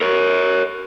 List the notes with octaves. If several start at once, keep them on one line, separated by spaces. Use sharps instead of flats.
A#4 C#5